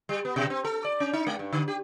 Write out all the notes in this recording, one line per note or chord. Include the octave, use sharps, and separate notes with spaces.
G3
B3
B2
C4
A4
D5
C#4
D#4
G#3
G2
D3
G4